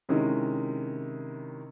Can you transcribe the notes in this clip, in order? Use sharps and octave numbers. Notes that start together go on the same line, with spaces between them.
C3 D#3 G#3 C#4 E4